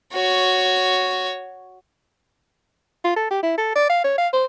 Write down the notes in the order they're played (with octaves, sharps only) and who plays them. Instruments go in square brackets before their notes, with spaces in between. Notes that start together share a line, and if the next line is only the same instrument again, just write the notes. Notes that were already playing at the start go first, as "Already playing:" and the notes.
[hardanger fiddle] F#4 C#5
[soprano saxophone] F4
A4
G4
E4
A4
D5
F5
C#5
F5
C5